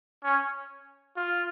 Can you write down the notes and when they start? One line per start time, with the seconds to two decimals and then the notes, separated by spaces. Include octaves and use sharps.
0.24 C#4
1.16 F4